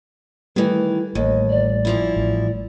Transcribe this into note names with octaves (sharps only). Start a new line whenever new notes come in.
D#3 E3 G3 A3 B4
A1 D#2 D#5
D5
A#2 F3 E4
A1